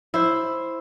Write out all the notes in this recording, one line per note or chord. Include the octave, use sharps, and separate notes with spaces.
E4 C5